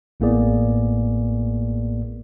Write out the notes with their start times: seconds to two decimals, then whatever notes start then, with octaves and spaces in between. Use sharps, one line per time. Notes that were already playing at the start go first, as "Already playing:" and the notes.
0.20 A1 A2 A#3 B3 G#4 D5